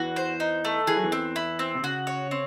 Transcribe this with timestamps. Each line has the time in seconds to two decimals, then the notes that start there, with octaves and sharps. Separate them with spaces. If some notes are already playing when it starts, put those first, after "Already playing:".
Already playing: E2 E3 F#4
0.16 C5
0.40 D#4
0.65 A3
0.87 E3 G#4
0.96 F#3
1.03 E2 E3
1.12 C4
1.36 E4
1.59 C4
1.75 C3
1.83 C#3 F#4
2.07 C#5
2.31 C4